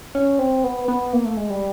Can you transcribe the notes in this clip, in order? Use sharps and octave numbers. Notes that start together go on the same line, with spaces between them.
C#4
C4
B3
B3
A#3
A3
G#3
G3